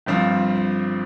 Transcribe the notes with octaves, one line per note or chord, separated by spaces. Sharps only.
G1 G2 F3 C4 F4